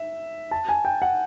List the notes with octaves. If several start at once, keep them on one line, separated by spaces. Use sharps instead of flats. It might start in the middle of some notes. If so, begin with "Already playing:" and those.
Already playing: E5
A5
G#5
G5
F#5